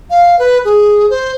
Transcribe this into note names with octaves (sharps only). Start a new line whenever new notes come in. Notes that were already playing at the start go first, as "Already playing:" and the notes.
F5
B4
G#4
C5